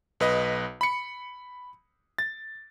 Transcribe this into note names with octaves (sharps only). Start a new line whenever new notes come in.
B1 B4 D#5
B5 C#7
A6